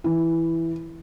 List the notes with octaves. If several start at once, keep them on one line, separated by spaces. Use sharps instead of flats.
E3